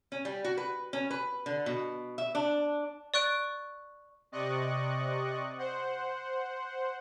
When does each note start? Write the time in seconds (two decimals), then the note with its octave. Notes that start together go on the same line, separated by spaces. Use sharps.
0.12 C#4
0.25 G3
0.45 F#4
0.57 B4
0.93 C#4
1.10 B4
1.46 D3
1.66 B2
2.18 E5
2.35 D4
3.14 D5 C#6 F#6 D7
4.32 C3 D5 D#5 C#6 F#6
5.58 C5 F#5